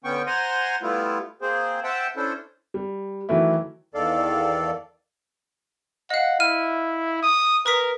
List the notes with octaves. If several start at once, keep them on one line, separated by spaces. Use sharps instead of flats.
D3 B3 C#4 G5 C#6
C5 F#5 G#5 A#5 C6
G3 A3 B3 E4 F4
A#3 C4 G#4 C5
C5 E5 F#5 G5 A5
C#4 D4 E4 A4 C5
G3
D#3 E3 F#3 A3 E4
E2 D#3 A4 D5 F5
D#5 F5 F#5
E4 F6 D#7
D#6
A#4 B4 D#6 B6